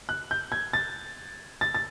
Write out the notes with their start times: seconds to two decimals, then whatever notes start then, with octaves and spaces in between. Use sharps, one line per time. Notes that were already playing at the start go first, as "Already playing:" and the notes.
0.09 F#6
0.31 G6
0.52 G#6
0.73 A6
1.61 A6
1.75 A6